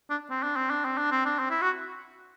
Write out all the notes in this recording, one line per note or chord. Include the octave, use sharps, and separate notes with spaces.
D4
C4
D4
C4
D4
C4
D4
C4
D4
C4
E4
F#4